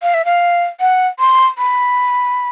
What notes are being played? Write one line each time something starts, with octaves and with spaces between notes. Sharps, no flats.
F5
E5
F5
F#5
C6
B5